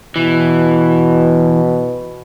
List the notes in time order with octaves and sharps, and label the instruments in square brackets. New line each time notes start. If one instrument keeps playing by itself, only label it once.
[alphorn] B2 [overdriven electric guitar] E3